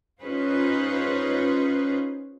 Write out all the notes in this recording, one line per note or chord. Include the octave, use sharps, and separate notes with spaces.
C#4 D#4 F4 G#4 B4 C5